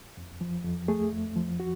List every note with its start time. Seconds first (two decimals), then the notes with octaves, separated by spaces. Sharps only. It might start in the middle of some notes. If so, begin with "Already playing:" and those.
0.17 F2
0.41 F3
0.65 F2
0.88 A3 G#4
1.13 F2
1.36 F3
1.60 F#4